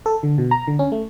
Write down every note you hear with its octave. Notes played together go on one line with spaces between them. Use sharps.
A4
D3
B2
A#5
D3
C#4
A3